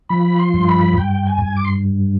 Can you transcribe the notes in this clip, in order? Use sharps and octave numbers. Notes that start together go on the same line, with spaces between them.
F3 B5
C6
G2
B5
G2 G5
G#5
G2
D6
C6